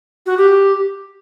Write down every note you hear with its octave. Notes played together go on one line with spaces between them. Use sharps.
F#4
G4